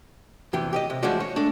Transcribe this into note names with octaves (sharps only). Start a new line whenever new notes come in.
E2 C3 E3 G4
G4 D5 D#5
C3
E3 F3 G#3 C#4 F#4 D5
C#5
G#3 A3 D4